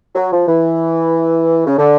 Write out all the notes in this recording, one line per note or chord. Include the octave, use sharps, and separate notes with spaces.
F#3
F3
E3
C#3
D3